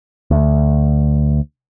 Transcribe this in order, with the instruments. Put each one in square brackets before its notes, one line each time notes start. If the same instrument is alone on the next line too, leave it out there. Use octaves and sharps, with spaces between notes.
[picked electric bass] D2